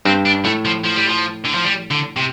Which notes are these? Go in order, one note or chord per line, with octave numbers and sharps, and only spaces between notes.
G2 C4
D4
A2 A3
F3
F3
G3
F3
D3
F3
G3
D3
C3